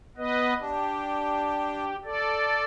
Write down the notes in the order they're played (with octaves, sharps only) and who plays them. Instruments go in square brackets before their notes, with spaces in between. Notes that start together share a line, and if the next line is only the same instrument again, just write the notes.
[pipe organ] B3 B4 D#5
[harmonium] D4 [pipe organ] G4
[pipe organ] A4 D5